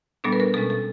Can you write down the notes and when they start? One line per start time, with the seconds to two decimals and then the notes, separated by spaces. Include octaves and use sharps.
0.24 A#2 G3 B3 D4 A4
0.32 B4
0.40 A#4
0.54 B2 G#3 C#4 A4
0.70 A4